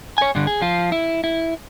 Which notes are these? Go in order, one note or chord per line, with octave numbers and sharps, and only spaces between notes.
C#5 G#5
G2 D3
G#4
F3 F4
E4
E4